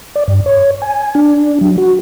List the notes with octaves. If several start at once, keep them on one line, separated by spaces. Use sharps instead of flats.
D5
G2
C#5
G#5
D4
F#3
F#4